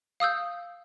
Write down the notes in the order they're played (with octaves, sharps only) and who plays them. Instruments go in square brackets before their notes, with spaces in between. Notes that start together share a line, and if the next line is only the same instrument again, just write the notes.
[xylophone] F5 D#6 E6 G6